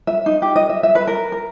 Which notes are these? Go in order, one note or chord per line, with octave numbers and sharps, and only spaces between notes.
E5
D#4
G4
D#5
E5
E5
B4
A#4
A#4